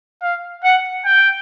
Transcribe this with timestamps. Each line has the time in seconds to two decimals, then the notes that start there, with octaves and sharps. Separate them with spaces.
0.22 F5
0.64 F#5
1.05 G5